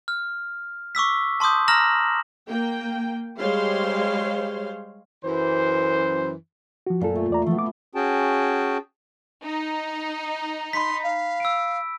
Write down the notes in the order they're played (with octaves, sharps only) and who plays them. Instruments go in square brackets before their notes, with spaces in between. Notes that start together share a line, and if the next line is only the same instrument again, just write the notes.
[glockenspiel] F6
C#6 D6 E6 B6
A5 C6 D6 D#6 G6
A#5 E6 F6 A#6 E7 F#7
[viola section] A#3 G5
G3 G#3 C5 C#5 F5 C6
[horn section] F#2 E3 C5
[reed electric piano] F3 F#4
[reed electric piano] F#2 A4 [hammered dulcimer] A#2
[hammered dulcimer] A3
[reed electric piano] E2 D5 A#5
[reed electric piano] E3 F3 [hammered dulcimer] A3 B3
[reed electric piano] F4 D6
[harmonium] C#4 F#4 G#4 G5 A5
[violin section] D#4
[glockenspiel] B5 B6 [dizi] C6
[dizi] F5
[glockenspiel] E6 D7